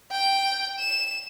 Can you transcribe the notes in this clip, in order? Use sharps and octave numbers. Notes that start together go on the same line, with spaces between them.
G5
E7